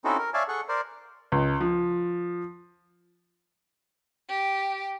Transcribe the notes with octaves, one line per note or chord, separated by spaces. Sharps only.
C4 C#4 D#4 E4 F#4 A4
A#4
C#5 D5 E5 F5 G#5 A5
G#4 A4 F#5 C#6
A#4 C5 D5
C#2
F3
G4